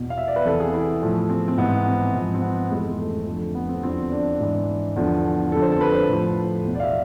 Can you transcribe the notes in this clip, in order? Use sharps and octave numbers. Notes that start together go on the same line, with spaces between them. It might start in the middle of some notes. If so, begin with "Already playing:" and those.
Already playing: E2 B2
F5
E5
D5
B4
E2 C3 E3 A4
G#4
E4
A2 F3
C4
C4
G#2 E3 B3
C4
G#2 F3
C4
B3
F2 C3 E3 G#3
G#3
A3
F2 D3 F3
B3
C4
E2 D3 F3 C4
D4
G#2 E3
E2 D3 F3
F2 D3 F3 A4
C5
A4
B4
C5
A2 F3
E2 B2
D5
F5
E5